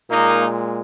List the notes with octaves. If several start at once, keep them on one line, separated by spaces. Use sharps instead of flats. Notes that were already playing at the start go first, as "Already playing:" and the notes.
A#2 G#3 A#3 D#4